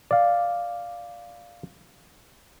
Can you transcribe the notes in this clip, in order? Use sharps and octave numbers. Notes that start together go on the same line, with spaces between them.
D5 F5